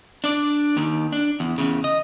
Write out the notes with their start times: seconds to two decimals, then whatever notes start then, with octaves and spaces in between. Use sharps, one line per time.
0.24 D4 D5
0.77 D#2 D#3
1.13 D4
1.40 E2
1.58 E2 C#3
1.84 D#5